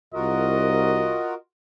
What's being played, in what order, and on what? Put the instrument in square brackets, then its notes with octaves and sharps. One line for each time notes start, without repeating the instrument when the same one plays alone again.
[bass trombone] C2 [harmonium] F4 F#4 A#4 [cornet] D#5